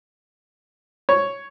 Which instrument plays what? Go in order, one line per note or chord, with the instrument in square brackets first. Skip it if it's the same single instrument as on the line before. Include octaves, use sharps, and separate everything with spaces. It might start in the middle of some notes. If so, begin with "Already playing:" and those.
[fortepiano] C#5